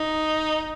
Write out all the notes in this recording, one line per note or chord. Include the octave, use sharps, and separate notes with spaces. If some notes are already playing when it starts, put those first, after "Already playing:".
Already playing: D#4